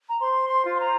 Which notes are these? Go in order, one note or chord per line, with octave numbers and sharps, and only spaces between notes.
A#5
C5 C6
C6
F4
C6
A#5